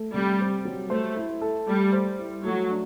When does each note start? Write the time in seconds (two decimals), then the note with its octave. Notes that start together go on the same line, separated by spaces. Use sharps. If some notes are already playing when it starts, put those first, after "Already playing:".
Already playing: A3
0.13 C3 G3
0.40 C4
0.65 F#3
0.90 A3 C5
1.16 E4
1.42 A4
1.68 G3 A3
1.92 C5
2.19 E4
2.44 F#3 A3
2.70 D4